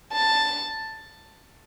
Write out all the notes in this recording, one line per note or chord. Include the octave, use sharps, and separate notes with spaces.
A5